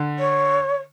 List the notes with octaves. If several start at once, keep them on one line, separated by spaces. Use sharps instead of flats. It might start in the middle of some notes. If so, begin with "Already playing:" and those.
Already playing: D3
C#5